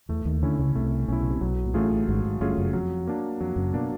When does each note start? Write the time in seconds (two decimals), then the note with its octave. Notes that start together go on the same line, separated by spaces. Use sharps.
0.09 E2 E3 A3
0.25 D#2 D#3
0.42 D2 D3 C#4 E4
0.58 C#2 C#3
0.75 C2 C3 A3
1.08 B1 B2 C#4 E4
1.20 C#3
1.30 C3
1.41 B1 B2 F#3
1.65 A#2
1.74 A1 A2 A3 C#4 F4 G#4
2.08 G#1 G#2 F#3
2.24 G#1 G#2
2.40 G1 G2 A3 C#4 F4 G#4
2.57 F#1 F#2
2.73 F2 F#3
3.07 A#3 D4
3.40 F2 F#3
3.56 F#1 F#2
3.73 B2 A#3 D4